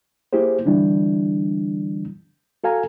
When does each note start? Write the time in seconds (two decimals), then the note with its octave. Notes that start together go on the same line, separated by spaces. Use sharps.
0.33 A#3 E4 G4 G#4 C5
0.65 D3 E3 G3 D4 E4
2.64 F#4 A4 F5 G#5 A#5